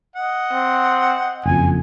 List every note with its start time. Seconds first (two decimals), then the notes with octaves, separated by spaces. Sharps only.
0.16 D#5 F#5
0.53 C4
1.46 F#1 F2 G#5